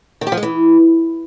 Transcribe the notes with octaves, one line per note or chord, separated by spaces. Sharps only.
D#3
G4
F3
G#3
E3